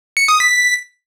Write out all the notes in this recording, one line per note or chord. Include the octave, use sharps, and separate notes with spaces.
C#7
D#6
B6